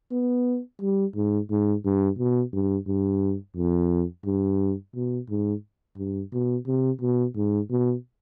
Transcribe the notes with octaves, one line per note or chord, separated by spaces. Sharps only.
B3
G3
G#2
G#2
G2
B2
G2
G2
F2
G2
B2
G#2
G2
B2
C3
B2
G#2
B2